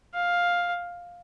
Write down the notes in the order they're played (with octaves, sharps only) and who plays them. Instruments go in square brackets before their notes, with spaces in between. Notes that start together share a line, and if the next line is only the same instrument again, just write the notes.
[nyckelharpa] F5